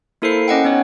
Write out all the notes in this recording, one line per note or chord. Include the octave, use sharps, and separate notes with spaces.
A#3 E4 A4 A#4 C5 C7
C#4 D#5 F#5 G5
B3 D#4 C#5